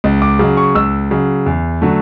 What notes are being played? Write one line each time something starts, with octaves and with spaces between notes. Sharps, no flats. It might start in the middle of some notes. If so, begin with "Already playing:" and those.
C#2
D6
C#3 F#3
C#6
C#2 E6
C#3 F#3
E2
D3 F#3 A3